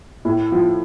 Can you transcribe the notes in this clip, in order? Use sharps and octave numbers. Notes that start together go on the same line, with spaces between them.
A2
F3